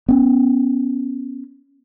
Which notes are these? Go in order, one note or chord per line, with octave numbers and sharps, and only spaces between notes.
B3 C#4